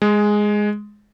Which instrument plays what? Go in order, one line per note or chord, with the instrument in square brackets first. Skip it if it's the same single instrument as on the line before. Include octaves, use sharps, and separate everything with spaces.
[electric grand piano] G#3